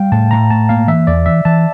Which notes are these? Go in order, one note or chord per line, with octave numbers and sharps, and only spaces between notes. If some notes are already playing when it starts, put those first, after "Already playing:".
Already playing: G3 F5 G5
A2 A5
A2 A#5
A2 A5
A#3 F5
E3 E5
E2 D5
E3 E5
E3 A5